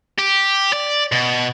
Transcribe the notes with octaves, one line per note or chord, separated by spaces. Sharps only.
G4
D5
B2